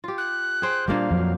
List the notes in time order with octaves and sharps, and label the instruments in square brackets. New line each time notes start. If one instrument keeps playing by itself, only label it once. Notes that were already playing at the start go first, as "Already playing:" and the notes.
[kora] F4 G4
[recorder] F#6
[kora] G#4 C5 G5
[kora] A#2 A#3 [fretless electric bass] G3 A3 D4 [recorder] F5
[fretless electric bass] F2 F3 F#3